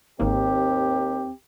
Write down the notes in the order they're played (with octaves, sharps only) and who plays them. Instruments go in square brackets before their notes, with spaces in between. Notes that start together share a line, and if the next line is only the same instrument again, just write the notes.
[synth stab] G#1 G#2 A#3 [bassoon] D#2 [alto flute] C4 [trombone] G4